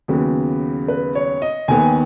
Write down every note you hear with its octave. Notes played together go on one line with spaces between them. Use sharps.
D#2 C#3 F#3 B3 G#4
B4
C#5
D#5
D#2 D#3 B3 G#5